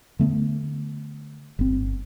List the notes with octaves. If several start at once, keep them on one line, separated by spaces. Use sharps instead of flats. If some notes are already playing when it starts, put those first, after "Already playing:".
D3 A3 B3
G1 C4